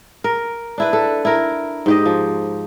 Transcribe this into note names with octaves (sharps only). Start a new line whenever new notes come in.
A#4
D4 E4 B4
A4
E4 A#4
G#2 G4 D#5
F3